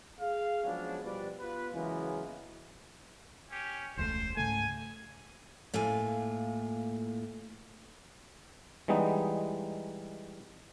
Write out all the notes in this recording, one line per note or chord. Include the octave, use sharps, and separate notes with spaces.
G#4 F5
F3 F#3 G#3 B3 C#4 D4
B2 F3 G3 B4 D5
B3 F4 B4
C#3 E3 F#3 G#3 A#3 B3
C#4 G4
E1 C#2 A3 C5
G#2 C#3 A3 G#5
A2 A#3 F4 F5 G#5
E3 G3 G#3 B3 D#4